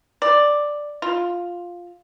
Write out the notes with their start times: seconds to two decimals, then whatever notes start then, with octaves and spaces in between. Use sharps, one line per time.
0.22 D5
1.02 F4